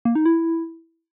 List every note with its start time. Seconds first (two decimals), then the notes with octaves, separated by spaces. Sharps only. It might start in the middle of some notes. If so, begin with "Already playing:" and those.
0.05 A#3
0.15 D#4
0.25 E4